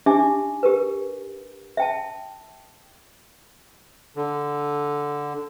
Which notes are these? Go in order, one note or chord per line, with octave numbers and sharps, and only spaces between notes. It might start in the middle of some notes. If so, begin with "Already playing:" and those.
D4 D#4 G4 E5 G#5 D6
G4 A#4 B4
E5 G5 A5
D3